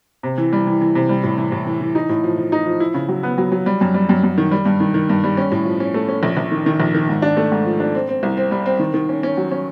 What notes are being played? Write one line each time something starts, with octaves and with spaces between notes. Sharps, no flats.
C3
E3
G3
E3
E3
C3
G3
A2
E3
A2
E3
E3
D#4
A2
F3
F3
D#4
F3
E4
C#3
F#3
B3
F#3
F#3
G3
F#2
G3
F#2
F#2
D#3
G3
G2
D#3
D#3
G2
G3
C#4
A2
F3
C#4
A3
C#4
A#1
A#1
D#3
D#3
A#1
D#3
G#2
D4
A3
G#2
F3
D4
C4
C4
C2
C4
G3
C4
D#3
D#3
C#4
C#4
F#3
C#4